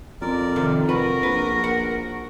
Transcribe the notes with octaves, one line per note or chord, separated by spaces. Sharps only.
F2 A#4 D5
C3 D#3 A4
F2 F#4 A#4 B4
A#1 B4
F#5